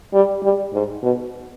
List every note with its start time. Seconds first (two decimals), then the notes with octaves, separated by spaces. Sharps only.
0.14 G3
0.43 G3
0.73 G#2
1.02 B2